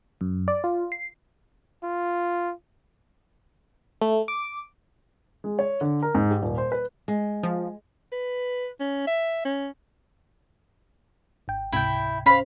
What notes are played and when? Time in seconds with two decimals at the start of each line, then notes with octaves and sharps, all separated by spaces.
0.21 F#2
0.48 D5
0.64 F4
0.92 C7
1.83 F4
4.01 A3
4.28 D6
5.44 G#3
5.59 C#5
5.81 D3
6.02 A#4
6.15 G#2
6.31 G4
6.42 D#1
6.58 C5
6.72 B4
7.08 G#3
7.43 F3
8.12 B4
8.80 C#4
9.07 E5
9.45 C#4
11.48 G#1 G5
11.72 C#2 G#2 C3 E4 G5
12.26 C#4 C5 F5 B5